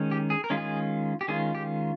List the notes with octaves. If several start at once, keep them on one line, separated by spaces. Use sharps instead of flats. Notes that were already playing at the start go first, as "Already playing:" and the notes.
Already playing: D#3 G#3 C#4
G4
G#4
A#4
D#3 G#3 C#4 F4
G#4
G4
D#3 G#3 C#4 F4 G#4
G4